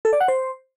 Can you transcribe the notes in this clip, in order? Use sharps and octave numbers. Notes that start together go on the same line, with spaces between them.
A4
D5
F#5
C5